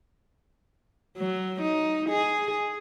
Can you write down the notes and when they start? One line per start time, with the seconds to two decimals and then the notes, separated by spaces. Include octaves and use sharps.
1.17 F#3
1.61 D#4
2.10 G#4